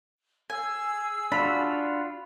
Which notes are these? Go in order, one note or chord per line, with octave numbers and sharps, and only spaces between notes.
G#4 G#5 E6
D4 F4 F#4 B5